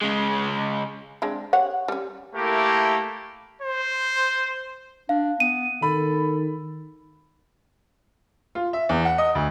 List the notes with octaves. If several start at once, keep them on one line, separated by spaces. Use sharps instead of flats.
C#3 G#3
G#3 C4 D4
G4 C#5 F#5
G3 C#4
A3 A#3 E4 G4 A#4
C5
D4 F5
B3 D#7
D#3 A4 B5
F4
E5
E2
F#5
D#5
D2